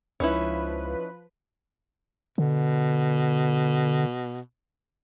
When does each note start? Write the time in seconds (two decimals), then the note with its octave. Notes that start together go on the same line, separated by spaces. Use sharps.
0.20 C#2 F3 C#4 D#4 E4 B4
2.38 B2 D3